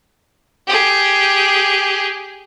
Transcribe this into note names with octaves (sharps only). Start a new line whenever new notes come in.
G4 G#4